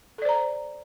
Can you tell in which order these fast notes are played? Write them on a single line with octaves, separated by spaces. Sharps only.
A4 D5 C5 A#5